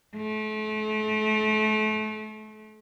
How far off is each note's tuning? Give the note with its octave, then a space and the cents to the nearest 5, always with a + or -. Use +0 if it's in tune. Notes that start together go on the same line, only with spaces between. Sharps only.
A3 -35